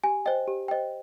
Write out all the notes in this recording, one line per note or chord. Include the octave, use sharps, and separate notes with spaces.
G4 G#5
C5 D#5 G5
G4
C5 D#5 G5